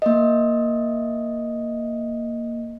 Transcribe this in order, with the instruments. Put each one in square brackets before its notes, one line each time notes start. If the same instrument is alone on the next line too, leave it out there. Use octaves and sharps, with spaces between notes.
[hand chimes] A#3 D#5